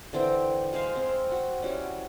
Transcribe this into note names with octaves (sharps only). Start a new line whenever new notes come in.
D3 E3 C4 G5
G#3 G#4 C5 F5
C4
F#4
G3 C#4 E4 F#4